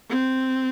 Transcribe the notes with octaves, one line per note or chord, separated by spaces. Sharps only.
C4